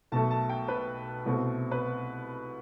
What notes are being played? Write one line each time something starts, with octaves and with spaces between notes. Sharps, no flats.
B1 B2 A3 A5
A5
G5
B4
C2 B2 A3 C4
B4